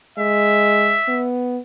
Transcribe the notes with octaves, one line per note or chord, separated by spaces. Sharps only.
G#3 E5
B3